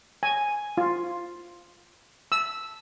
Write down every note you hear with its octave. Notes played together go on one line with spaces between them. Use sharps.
G#5
F4
E6